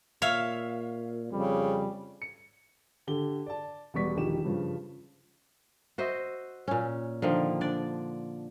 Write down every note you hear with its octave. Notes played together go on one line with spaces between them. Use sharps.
A#2 C#5 E5 F5
F2 C#3 G3
C#7
D3 G4 G7
D5 A5
E1 G3 B3 D5 C#6 B6
E1 A#1 D#3 G4 E7
G2 C#3 F3
F#4 C5 D#5 E5
A#2 C#4
D3 D#3 F3 A#3
D4 D5